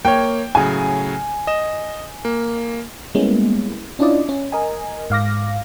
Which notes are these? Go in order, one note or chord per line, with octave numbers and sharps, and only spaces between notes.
A#3 C#5 G5
A2 C#3 F#3 G#5
D#5 E7
A#3
G3 G#3 A#3 B3 C#4 E4
C#4 D4 E4 F4 D5 D#5
C#4
A#4 D#5 G#5
G#2 F5 D6 A#6